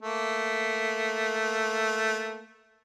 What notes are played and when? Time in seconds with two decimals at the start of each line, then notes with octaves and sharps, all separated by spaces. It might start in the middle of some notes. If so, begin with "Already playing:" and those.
0.03 A3 A#3